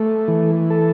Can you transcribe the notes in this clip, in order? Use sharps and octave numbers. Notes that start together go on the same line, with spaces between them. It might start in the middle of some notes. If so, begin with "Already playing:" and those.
Already playing: A3
E3
A4